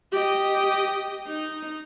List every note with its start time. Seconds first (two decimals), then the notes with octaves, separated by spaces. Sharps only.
0.12 G4 D#5
1.27 D#4